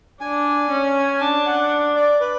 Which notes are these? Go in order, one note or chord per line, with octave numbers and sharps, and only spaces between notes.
D4 G#5
C#4
D4 A5
F#5
D5
B4